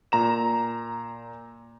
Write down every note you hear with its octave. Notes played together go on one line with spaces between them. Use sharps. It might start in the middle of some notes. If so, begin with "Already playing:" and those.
A#2 A#5 E7